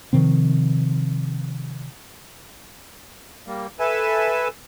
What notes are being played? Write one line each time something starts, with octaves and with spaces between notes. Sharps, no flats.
C3 D#3 F3 C4
G3 A#3
A4 B4 E5 G#5 A5